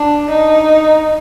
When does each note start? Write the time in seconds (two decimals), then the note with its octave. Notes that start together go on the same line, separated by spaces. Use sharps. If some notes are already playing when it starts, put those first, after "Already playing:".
Already playing: D4
0.30 D#4